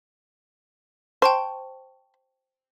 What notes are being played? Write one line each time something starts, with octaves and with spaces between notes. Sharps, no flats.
C5 G5 A5 C#6